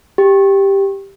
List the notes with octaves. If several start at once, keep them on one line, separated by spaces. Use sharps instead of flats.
G4